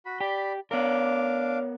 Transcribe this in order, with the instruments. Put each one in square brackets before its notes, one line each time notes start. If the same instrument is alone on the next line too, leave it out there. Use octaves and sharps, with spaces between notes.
[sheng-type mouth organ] F#4 B5
[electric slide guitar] G4 [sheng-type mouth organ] D5 B5
[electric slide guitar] B3 A#4 [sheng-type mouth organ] D4 F5 D6 [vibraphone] C#5